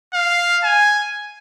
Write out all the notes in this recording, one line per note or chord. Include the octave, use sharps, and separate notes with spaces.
F5
G#5